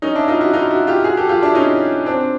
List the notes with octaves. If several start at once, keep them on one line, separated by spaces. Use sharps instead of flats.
C#4 D#4
D4 E4
D#4 F4
E4 F#4
D#4 F4
E4 F#4
F4 G4
F#4 G#4
G4 A4
F4 G4
D4 E4
C#4 D#4
C4 D4